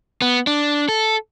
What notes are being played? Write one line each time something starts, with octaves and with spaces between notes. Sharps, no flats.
B3
D4
A4